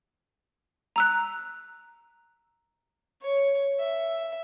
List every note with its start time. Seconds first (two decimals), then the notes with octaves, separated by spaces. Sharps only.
0.96 A#5 E6 F#6
3.22 C#5
3.79 E5